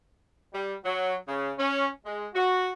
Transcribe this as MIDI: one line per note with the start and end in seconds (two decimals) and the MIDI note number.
0.53 0.75 55
0.84 1.14 54
1.27 1.51 49
1.59 1.87 61
2.05 2.27 56
2.34 2.71 66